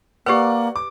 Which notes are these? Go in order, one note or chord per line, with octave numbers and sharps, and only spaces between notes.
A#3 G4 B4 D5 F#5
D6